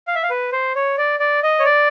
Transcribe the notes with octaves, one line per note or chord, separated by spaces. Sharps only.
F5
E5
F5
B4
C5
C#5
D5
D5
D#5
C#5
D5